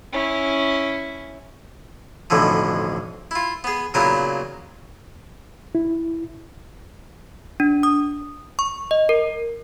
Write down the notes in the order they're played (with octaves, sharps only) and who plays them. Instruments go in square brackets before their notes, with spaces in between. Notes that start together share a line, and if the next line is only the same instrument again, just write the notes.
[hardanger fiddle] C#4 E4
[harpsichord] B1 F2 A2 D3 E3 F3
E4 F4
B3 G#4
A#2 C#3 F#3 B3 E4 A#4
[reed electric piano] E4
[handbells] D4
D#6
C#6
D#5
A#4